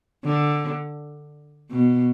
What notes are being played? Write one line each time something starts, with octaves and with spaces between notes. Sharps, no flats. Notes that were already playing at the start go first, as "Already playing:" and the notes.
D3
B2